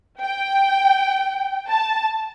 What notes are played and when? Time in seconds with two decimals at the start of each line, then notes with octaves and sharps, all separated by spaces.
0.23 G5
1.69 A5